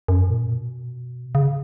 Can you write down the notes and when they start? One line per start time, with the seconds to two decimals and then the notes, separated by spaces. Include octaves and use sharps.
0.08 F#2
0.30 A#2
0.50 B2
1.35 C#3